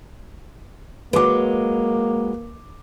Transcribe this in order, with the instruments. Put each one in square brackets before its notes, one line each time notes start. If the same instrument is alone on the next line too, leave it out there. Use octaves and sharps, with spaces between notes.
[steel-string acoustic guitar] F#3 G#3 [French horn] A#3 [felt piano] B4 D6